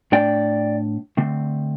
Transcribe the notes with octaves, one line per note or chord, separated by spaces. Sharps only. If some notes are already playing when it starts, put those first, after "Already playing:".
A2 A3 D4 D5 G5
D3 A3 C4